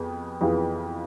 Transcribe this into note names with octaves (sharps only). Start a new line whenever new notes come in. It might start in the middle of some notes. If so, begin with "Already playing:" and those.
Already playing: F2 B3 G#4
F2 E3 B3 F4 G#4